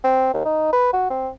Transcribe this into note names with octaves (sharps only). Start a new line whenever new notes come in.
C4
D#2
D#4
B4
F#4
C4